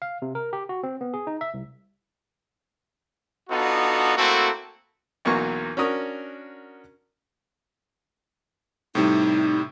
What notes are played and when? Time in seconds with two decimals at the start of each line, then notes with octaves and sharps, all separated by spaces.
0.02 F5
0.22 C3
0.35 A#4
0.53 G4
0.69 F#4
0.83 C4
1.01 B3
1.14 G#4
1.27 D#4
1.41 E5
1.54 C2
3.50 B3 D4 D#4 F4 F#4 A4
4.17 A3 A#3 C4 E4 F#4 A4
5.25 B1 E2 F#3 A#3 C#6
5.77 C#4 D4 F#4 A#4 D#6
8.95 A2 C3 G3 D#4